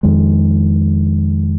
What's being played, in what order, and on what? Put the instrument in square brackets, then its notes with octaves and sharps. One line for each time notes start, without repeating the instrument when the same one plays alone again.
[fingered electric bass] F2 D#3 G#3